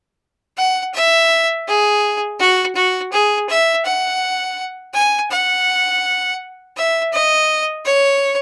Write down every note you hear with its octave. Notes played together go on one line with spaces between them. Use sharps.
F#5
E5
G#4
F#4
F#4
G#4
E5
F#5
G#5
F#5
E5
D#5
C#5